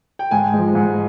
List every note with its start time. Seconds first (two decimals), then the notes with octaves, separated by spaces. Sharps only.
0.19 G5
0.31 G#2 G#5
0.53 F3 G#3
0.75 G#2